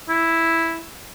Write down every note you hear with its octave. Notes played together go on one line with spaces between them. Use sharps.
E4